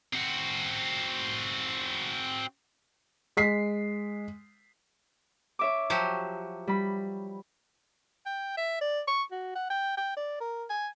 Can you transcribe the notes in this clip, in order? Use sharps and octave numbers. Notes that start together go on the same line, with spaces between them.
C4 F#4
G#3 B6 C7
C#5 E5 D6
F3 F#3 G4
G3 B5
G5
E5
D5
C#6
F#4
F#5
G5
G5
D5
A#4
G#5